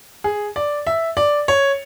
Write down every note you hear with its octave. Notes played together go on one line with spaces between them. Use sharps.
G#4
D5
E5
D5
C#5